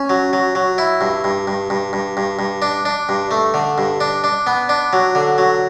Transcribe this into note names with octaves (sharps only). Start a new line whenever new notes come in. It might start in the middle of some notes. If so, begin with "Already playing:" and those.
Already playing: C#4
F#3
F#3
F#3
E4
G2
G2
G2
G2
G2
G2
G2
D4
D4
G2
A3
D3
G2
D4
D4
B3
D4
F#3
D3
F#3